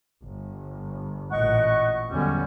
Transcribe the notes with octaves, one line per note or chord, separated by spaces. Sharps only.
G1
A1 A#2 D#5 F#5 C#6
E2 D3 F#3 G3 B3 C#4